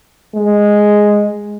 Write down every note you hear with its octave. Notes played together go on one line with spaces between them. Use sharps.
G#3